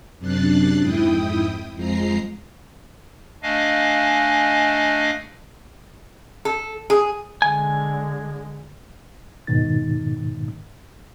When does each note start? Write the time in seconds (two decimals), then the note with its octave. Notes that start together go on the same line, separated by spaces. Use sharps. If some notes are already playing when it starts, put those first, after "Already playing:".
0.19 F#2 C3 D4 F#6 A6 C7
0.80 F2 G#2 E4 G5 D#6
1.74 F2 F3 G#3 A#5 C7
3.43 A3 D4 D#5 F5 G#5
6.45 A4
6.90 G#4
7.42 D3 G#3 G#5
9.47 F2 G#2 B2 D#3 D#4 A6